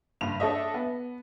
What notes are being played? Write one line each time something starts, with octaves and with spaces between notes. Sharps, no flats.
F#1 G2 F7
D4 A4 C#5 D#5 E5
B3